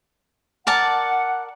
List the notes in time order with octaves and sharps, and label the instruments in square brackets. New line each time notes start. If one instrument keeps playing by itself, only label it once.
[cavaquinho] A#4 D5 A5 [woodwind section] F#5